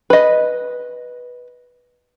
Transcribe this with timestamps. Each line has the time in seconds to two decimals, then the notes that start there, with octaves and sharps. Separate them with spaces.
0.10 B4 D#5